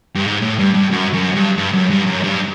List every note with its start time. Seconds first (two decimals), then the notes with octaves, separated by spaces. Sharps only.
0.15 G2
0.26 G#2
0.42 A2
0.59 G2
0.75 G2
0.92 F#2
1.14 F#2
1.35 G2
1.58 G2
1.73 F#2
1.90 G2
2.06 F#2
2.23 G2